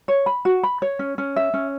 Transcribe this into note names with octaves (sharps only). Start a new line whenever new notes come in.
C#5
B5
F#4
B5
C#5
C#4
C#4
E5
C#4